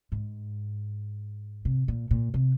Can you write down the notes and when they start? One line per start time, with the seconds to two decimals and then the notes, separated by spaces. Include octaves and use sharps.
0.12 G#2
1.65 C3
1.88 A#2
2.11 A#2
2.34 C3